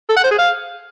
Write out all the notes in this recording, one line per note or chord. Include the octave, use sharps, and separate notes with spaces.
A4
F#5
C5
G#4
F5